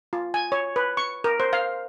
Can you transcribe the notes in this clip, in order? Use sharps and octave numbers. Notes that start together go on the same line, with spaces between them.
F4
G#5
C#5
B4
C#6
A#4
C5
F5